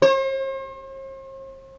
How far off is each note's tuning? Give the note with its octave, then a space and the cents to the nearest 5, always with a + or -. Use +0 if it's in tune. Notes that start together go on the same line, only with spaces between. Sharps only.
C5 +45